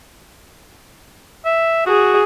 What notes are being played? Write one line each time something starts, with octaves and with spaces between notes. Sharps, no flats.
E5
F#4 G#4